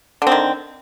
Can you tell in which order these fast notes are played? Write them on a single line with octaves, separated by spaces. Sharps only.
D3 C4 D#3